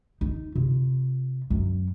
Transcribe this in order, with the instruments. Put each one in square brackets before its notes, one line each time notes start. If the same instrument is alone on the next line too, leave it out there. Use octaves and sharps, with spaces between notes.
[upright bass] D#4
C3 F4
F#2 F#3